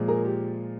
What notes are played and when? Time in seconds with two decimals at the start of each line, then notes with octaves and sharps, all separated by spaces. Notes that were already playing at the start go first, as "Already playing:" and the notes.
Already playing: A#2 F3 G#3
0.08 G#4 A#4
0.25 G4